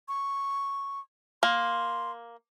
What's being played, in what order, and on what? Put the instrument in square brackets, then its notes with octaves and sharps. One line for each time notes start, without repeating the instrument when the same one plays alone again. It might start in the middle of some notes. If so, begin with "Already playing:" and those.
[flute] C#6
[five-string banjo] A#3 [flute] C6